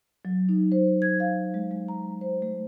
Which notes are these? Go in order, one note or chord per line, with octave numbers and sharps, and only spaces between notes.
F#3
D#4
C5
G#6
F5
G#3
G#3
A#5
C5
A3